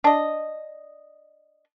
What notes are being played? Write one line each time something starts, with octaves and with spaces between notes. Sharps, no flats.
D4 D#5